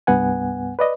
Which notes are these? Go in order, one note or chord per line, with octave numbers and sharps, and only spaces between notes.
C2 G2 B3 F#5 G#5
B4 D5 D#5